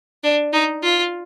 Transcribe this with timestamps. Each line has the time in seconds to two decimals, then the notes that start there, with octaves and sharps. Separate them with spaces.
0.24 D4
0.53 D#4
0.83 F4